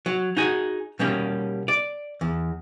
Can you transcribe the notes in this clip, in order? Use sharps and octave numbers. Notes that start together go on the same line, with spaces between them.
F#3
D#4 F#4 G#4
B2 G3 A#3 C#4
D5
E2